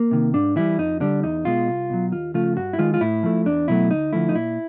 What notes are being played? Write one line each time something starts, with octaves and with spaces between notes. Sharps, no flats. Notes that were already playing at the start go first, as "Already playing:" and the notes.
Already playing: A#3
C3 D#3
G#2 D4
E3 G3 E4
F2 D#4
D3 G3 D4
E2 D#4
B2 G#3 F4
C2
B2 F#3
D#2 F4
C#3 F3 A3 F4
G2 F#4
E4
D#3 G#3 F4
F4
A2 E4
F3 A3
E2 D4
B2 F#3 A3 E4
D2 D#4
D3 F3 A3 E4
D#4
A#2 E4